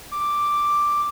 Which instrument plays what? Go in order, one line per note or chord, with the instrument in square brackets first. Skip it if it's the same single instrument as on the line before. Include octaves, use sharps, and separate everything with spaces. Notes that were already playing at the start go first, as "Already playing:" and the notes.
[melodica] D6